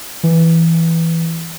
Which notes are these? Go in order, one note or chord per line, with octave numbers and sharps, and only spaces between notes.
E3